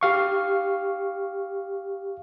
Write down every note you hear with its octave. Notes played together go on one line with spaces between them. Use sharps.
G4 F5 C#6